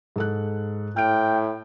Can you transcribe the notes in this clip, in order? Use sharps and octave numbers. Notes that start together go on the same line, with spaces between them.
G#2 A4 F#6
A2 G5 F6 D7